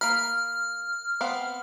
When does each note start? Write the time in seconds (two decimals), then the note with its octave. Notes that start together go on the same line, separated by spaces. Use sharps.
0.01 A#3 B5 F6
1.21 B3 C4 F5